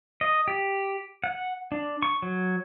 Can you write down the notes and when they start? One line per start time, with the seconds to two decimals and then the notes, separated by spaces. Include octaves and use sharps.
0.21 D#5
0.48 G4
1.24 F#5
1.72 D4
2.02 C#6
2.22 F#3